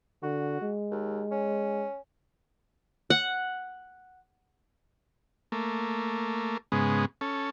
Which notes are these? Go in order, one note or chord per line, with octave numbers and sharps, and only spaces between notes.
D3 F#4
G#3
D#2
C#4
F#5
A3 A#3
G#2 C#3 G#3 B3
C#4 A4